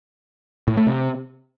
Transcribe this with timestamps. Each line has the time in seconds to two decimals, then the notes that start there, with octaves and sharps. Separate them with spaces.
0.68 A2
0.77 A3
0.87 C3